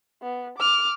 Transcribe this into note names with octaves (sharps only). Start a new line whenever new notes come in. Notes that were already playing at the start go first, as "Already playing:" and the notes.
B3
D6 F6